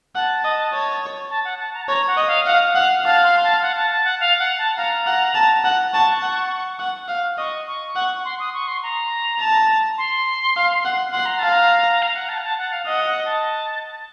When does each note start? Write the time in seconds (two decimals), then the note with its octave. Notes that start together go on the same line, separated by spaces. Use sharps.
0.15 F#5 A5
0.44 D#5
0.73 C#5
1.30 A5
1.45 F#5
1.60 A5
1.74 A#5
1.81 A5
1.88 C#5 A#5
2.07 F#5
2.17 D#5
2.27 F5
2.46 F5 F#5
2.75 F5 F#5
3.04 F5 A5
3.23 C6
3.43 A5
3.62 F#5
3.76 A5
3.91 A5
4.05 F#5
4.20 F5
4.39 F#5
4.58 A5
4.77 F5 A#5
5.07 F#5
5.35 A5
5.65 F#5
5.93 A5 C#6
6.23 F#5
6.79 F#5
7.08 F5
7.38 D#5 C#6
7.67 C#6
7.96 F#5
8.25 C6
8.40 D#6
8.54 C#6
8.67 C6
8.83 A#5
9.40 A5
9.98 C6
10.56 F5
10.85 F#5
11.13 F#5 C6
11.26 A#5
11.39 F5 A5
11.51 A#5
12.02 F5
12.16 F#5
12.29 A5
12.38 F#5
12.44 A5
12.59 F#5
12.72 F5
12.87 D#5 F#5
13.07 F#5
13.25 A5